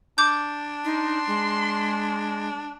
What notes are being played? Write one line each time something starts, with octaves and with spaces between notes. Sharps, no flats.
D4 D6 G6
D#4 C6
G#3